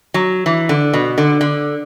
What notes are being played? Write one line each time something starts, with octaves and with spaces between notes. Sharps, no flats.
F#3
E3
D3
B2
D3
D3